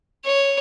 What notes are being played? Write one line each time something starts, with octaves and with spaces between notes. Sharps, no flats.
C#5